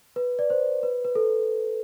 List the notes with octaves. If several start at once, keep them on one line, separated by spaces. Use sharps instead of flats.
B4
D5
C5
B4
B4
A4